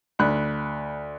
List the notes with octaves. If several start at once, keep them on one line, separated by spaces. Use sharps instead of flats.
D2 B5 F#6